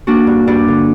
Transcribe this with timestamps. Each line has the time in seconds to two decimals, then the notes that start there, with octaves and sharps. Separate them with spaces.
0.07 A#3 D4 F#4
0.27 G2
0.47 G2 D4
0.68 D3